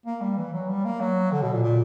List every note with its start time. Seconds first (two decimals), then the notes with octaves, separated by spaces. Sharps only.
0.06 A#3
0.21 G3
0.37 E3
0.53 F#3
0.69 G3
0.85 A#3
1.01 F#3
1.32 D3
1.43 B2
1.52 A#2
1.63 A#2